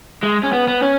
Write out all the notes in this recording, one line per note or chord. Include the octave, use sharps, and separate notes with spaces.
G#3
C#4
B3
B3
C#4